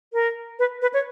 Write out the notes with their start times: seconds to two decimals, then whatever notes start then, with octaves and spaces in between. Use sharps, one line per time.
0.13 A#4
0.59 B4
0.82 B4
0.94 C#5